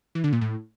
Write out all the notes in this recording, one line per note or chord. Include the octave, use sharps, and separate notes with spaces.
E3
D3
A#2
A2